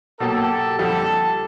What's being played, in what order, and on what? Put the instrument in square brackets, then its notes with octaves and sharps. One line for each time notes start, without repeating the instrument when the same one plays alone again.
[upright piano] B2 F#3 A#3 [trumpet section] G4 A4
[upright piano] F2 D3 G3 [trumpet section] G4 A4